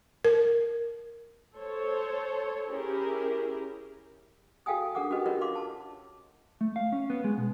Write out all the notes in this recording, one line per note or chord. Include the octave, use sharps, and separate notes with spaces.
A#4
A4 C5 C#5
C#4 E4 G4 G#4 A#4
F#4 A4 F5 G5 G#5 D#6
D4 A4 A#4 F#5 D6 D#6
C#4 F#4 G4 A4 B4 D#5
F4 F#4 A#4 C#5 D#5
F4 F5 C6 D6
A5
A3
F5
C#4
B3
G#3
B2